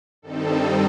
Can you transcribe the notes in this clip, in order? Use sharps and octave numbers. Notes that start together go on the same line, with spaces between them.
G2 D#3 G3 C4 D#4 A4